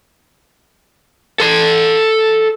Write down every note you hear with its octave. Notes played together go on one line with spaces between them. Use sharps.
A4 C6